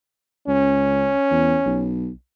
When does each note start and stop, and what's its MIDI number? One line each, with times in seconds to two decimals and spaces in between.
0.48 1.10 37
0.48 1.90 61
1.31 1.57 40
1.66 2.10 35